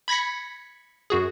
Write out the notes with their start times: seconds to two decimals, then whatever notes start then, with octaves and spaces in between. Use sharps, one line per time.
0.08 B5 G#6 A#6 B6 C#7
1.10 F#2 F#4 G#4